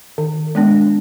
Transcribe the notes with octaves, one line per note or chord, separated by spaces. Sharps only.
D#3
G#3 B3 D4